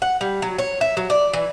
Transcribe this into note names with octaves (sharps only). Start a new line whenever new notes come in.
F#5
G3
F#3
C#5
E5
F#3
D5
E3